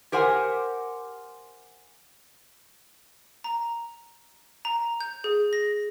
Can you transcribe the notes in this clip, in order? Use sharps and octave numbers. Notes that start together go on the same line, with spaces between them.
G4 A#4 C5 F#5 G#5
A#5
A#5
G6
G#4
A#6